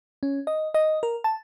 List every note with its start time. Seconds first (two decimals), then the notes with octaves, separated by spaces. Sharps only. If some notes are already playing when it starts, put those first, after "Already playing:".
0.23 C#4
0.47 D#5
0.74 D#5
1.03 A#4
1.24 A5